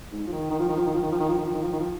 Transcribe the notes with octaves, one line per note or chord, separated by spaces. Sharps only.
G#2
F3
D#3
D#3
F3
D#3
F3
D#3
F3
D#3
F3
D#3
F3
D#3
F3
D#3
F3
D#3
F3